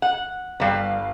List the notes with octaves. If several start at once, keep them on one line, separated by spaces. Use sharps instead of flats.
F#5
G1 G3 B4 F5 C7